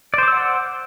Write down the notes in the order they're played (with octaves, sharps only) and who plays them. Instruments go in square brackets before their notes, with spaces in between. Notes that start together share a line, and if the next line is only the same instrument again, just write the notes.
[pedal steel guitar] D5
C5
D6
E6
F#5